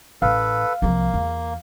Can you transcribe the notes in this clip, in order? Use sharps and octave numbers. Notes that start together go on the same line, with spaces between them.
A1 A4 B4 F5
C2 F3 A#3
E2